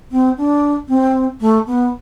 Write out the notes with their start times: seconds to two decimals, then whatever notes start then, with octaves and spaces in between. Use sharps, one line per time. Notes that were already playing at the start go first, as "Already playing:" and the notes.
0.11 C4
0.37 D4
0.88 C4
1.40 A3
1.67 B3